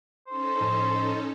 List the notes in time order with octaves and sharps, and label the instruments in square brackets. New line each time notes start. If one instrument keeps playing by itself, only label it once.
[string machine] C#4 D#4 A4 [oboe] C5
[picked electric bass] A2 F3